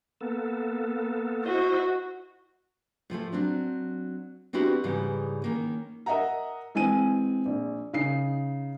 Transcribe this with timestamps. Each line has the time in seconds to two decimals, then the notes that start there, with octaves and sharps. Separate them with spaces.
0.21 A#3 B3 A4
1.45 E4 F#4 C5 D#5
3.10 A2 F3 G3 A3
3.32 F#3 C4 D4
4.53 B3 C4 D4 E4 F#4 G4
4.84 G#2 C#3 E3 G3
5.42 D#3 A#3 C#4
6.06 A#4 D#5 E5 F#5 A#5
6.75 E3 G#3 C4 G#5 D#7
7.46 A#1
7.93 C#3 D#4 C7